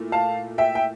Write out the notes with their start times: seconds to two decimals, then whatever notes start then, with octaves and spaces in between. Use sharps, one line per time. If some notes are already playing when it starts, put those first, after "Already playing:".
Already playing: A#2 A3 E4
0.12 F5 A5
0.58 E5 G5
0.75 G5